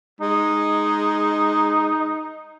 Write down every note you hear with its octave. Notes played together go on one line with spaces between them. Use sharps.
G#3 D#4